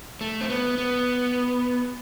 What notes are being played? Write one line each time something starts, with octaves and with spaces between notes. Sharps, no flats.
A3
C4
B3
B3